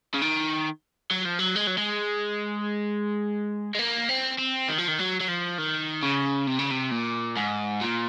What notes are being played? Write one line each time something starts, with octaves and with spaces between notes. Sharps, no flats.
C#3
D#3
F#3
F3
F#3
G#3
F#3
G#3
G#3
A#3
C4
C4
D#3
F3
D#3
F#3
F#3
F3
D#3
C#3
C3
C#3
C3
A#2
G#2
A#2